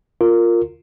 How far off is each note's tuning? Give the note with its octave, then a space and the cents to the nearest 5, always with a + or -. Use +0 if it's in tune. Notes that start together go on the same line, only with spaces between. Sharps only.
F4 +0 A#4 -15